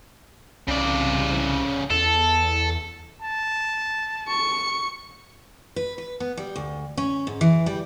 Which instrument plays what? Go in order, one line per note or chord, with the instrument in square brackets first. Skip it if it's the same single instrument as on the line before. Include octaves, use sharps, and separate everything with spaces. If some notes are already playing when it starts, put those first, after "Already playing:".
[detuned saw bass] C2 [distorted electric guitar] C#3 D5
[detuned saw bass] E2 [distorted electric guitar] A4
[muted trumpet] A5
[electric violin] C#6 C#7
[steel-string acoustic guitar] B4
B4
B3
G3
D2
C#4
G#2
E3
G3